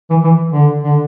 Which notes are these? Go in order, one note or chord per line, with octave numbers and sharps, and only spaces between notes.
E3
E3
D3
D3